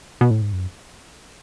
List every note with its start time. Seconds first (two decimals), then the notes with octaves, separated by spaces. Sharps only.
0.21 B2
0.30 A2
0.42 G#2
0.53 F#2